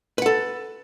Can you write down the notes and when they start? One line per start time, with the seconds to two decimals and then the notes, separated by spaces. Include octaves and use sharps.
0.18 B4
0.22 F#5
0.26 A4